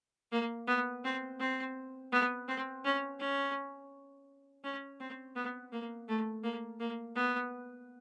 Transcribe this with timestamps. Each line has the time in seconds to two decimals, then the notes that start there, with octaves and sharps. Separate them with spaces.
0.32 A#3
0.67 B3
1.04 C4
1.40 C4
2.12 B3
2.48 C4
2.84 C#4
3.19 C#4
4.64 C#4
5.00 C4
5.35 B3
5.72 A#3
6.08 A3
6.43 A#3
6.80 A#3
7.15 B3